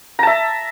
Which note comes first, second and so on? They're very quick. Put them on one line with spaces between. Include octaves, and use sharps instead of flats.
A#5 A5 E5